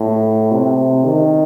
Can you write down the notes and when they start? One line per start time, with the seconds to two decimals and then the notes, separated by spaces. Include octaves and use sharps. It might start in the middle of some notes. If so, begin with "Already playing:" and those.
Already playing: A2
0.52 C3
1.05 D#3